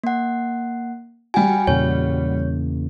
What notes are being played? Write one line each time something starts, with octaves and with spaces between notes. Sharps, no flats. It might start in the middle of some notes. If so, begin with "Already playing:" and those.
A#3 F#5
G3 F#4 G5 G#5
E2 A#2 C#3 C#5